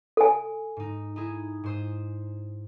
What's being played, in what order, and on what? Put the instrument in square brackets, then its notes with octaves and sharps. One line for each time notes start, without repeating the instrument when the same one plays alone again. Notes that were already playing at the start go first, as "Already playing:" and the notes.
[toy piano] A4 G#5
[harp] G#2 D#4
D#4 E4 G#4
G#2 C5 D#6